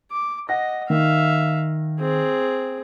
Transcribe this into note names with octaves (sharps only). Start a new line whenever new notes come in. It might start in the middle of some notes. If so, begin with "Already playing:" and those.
D6
D#5 F#5 A#6
D#3 E5 F5
C4 G#4